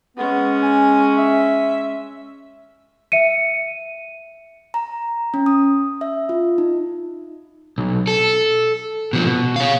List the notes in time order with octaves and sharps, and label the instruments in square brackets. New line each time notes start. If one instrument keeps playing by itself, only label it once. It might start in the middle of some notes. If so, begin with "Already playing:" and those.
[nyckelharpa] G#3 C#4 [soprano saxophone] B3
[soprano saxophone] G#5
E5
[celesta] E5 C#7 D#7
[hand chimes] A#5
C#4
D#6
E5
F4
D#4
[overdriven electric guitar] B1
A4
B2 F3
B2
C#5 F5